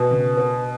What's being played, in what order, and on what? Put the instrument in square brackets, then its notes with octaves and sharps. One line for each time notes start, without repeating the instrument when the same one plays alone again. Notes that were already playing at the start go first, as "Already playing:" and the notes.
Already playing: [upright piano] B2
[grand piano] C#3
B3